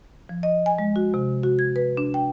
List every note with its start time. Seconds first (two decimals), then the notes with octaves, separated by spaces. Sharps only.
0.29 F3
0.43 D#5
0.66 G#5
0.79 G#3
0.96 F#4
1.14 C3
1.43 F#4
1.59 G#6
1.76 B4
1.97 D4
2.14 G5